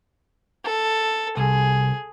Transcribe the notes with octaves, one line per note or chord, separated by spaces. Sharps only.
A4
C2 G#4